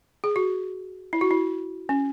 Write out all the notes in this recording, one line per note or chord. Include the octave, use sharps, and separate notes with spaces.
G#4
F#4
E4
F#4
E4
C#4